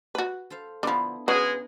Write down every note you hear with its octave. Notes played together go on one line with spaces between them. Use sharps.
F#4 B4
A4 C5 F5
D3 F3 B3 D4 E4
C#3 G#3 F#4 G#4 B4